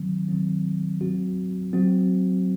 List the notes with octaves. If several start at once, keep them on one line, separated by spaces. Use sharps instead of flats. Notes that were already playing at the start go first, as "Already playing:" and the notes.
Already playing: D#3 F#3 C4
D#3 F#3 C4
F#3 C4 F#4
F#3 C4 F#4